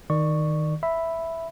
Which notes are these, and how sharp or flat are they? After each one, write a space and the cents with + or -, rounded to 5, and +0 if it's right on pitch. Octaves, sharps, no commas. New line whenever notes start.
D#3 +0 D5 +25 C#6 +0
E5 +0 B5 +0